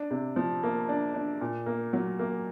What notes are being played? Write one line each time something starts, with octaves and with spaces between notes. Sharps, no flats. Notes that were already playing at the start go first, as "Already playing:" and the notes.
Already playing: D4
C3
F3
A#3
D4
D4
A#2
A#3
F#3
A#3